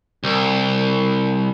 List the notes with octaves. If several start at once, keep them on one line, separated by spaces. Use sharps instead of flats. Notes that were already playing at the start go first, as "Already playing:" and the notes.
C2